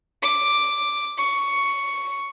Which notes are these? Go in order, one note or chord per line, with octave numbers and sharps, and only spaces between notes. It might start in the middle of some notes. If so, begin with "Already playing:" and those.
D6
C#6